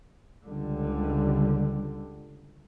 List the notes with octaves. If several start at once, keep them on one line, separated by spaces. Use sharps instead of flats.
C#2 D3 G3